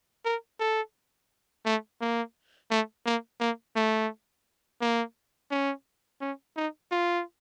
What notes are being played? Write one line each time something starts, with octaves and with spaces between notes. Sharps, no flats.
A#4
A4
A3
A#3
A3
A#3
A#3
A3
A#3
C#4
C#4
D#4
F4